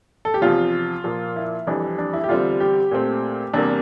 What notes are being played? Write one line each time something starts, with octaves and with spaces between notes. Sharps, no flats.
A4
G4
E2 C3 F3 F4
A#2 F3 A#3
E4
F2 E3 G3 C4 D4
D4
E4
G4
E2 D3 G3 C4 F4
G4
A#2 A3 C4
E2 C3 G3 A#3 D4